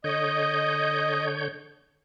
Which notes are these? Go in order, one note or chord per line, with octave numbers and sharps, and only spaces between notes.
D3 C#5 D#5 G6